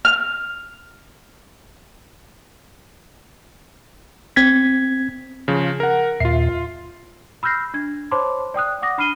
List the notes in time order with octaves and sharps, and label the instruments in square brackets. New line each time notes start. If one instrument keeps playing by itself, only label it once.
[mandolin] F6
[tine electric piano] C4 G#6 B6
[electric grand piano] C#3 F3
A#4 F#5
[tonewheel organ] D#2 A#2 E5 [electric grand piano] F4 C7
[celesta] B5 E6 F6 G6 A#6 C7
D4 G#6
C5 C#5 A5 B5 C6 D6
D5 G5 D#6 F#6
F#5 D6 D#6 A#6
D4 B5 F6 C7 D#7 G7